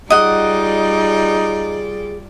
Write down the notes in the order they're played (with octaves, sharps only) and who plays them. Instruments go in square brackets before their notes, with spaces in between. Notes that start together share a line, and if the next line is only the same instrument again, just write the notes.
[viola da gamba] G3 F4 D5 [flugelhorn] D#4 [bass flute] G#4 [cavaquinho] D#5 F#5